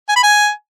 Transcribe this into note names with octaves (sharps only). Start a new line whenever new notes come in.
G#5
B5
G#5